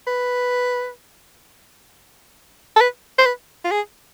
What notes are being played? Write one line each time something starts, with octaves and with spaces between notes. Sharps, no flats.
B4
A4
B4
C5
B4
F4
G#4